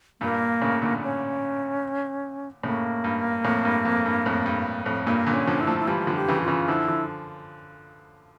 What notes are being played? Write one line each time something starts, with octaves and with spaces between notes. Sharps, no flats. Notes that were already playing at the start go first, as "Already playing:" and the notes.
G2 A#2 A#3
A2 C#3
A#2 D3
C#4
A2 C#3 A#3
G2
F2 A2
G2
F2
G2
F2 A2
G2
F2 A2
G2 A#2 A#3
A#2 D3
C#4
D3 F3
E4
F3 A3
E4
E3 G3 F4
D3 F3
G4
C#3 E3
F4
C#3 E3
D3 F3 E4
D3 F3